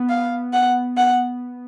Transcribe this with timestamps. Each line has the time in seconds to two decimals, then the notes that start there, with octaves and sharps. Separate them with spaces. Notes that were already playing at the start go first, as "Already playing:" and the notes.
Already playing: B3
0.09 F5
0.53 F#5
0.97 F#5